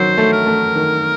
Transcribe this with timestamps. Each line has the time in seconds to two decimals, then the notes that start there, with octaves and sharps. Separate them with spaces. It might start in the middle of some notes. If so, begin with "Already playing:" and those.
Already playing: D#3 F#3 C5
0.18 A3
0.32 A#4
0.46 A3
0.75 D#3